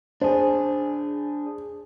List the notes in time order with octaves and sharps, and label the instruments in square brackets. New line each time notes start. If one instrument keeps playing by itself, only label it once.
[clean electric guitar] D4 G#4 [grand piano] C5